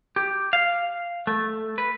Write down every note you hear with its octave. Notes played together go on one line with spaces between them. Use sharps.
G4
F5
A3
B4